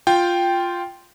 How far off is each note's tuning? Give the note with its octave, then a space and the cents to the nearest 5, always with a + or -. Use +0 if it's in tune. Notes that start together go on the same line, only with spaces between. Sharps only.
F4 +0 G5 +0